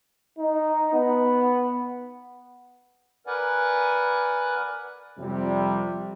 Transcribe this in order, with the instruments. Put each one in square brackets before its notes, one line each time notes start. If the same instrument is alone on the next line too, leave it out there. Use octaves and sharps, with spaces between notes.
[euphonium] D#4
B3
[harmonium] A#4 B4 D5 F#5 G#5
[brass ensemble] F2 C3 G3